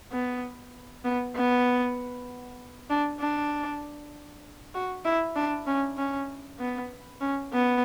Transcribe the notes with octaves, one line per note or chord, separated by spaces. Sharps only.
B3
B3
B3
D4
D4
F#4
E4
D4
C#4
C#4
B3
C#4
B3